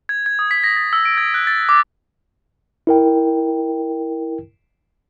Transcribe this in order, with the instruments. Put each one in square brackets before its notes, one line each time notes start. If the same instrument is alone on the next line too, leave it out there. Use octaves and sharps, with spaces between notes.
[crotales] G#6
G#6
D#6
B6
A#6
A6
E6
D7
G#6
F#6
A6
D6
[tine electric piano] E4 A#4 G5